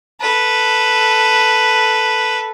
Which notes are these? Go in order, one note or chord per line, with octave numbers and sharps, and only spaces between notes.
A4 B4